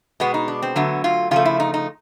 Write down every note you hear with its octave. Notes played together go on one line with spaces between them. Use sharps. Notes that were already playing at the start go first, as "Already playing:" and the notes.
B2 G#3 B3
D#4
D4
C4
D3 F#3 A3 B3
F4
C#3 F3 A3 F4
E4
D#4
D#4